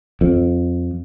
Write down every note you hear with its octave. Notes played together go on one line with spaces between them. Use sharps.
F2